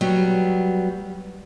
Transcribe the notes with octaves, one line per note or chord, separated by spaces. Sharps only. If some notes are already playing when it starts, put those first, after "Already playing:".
F#3 G3 B3